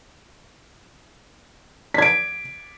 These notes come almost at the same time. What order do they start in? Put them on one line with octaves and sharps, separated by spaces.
B6 G#6 D7